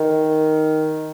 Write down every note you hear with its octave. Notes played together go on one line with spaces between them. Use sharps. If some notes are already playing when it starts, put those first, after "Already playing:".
Already playing: D#3